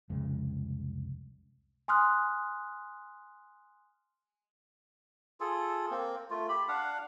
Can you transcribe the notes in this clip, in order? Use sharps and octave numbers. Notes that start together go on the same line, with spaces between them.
C2 F2 C#3 G#3
G#5 C6 D#6 F6 F#6
F4 G#4 A4
A#3 C4
A3 F4
G4 B5
D4 F5 F#5